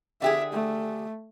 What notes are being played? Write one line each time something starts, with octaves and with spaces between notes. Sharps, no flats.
D3 G4 G#4 E5
A3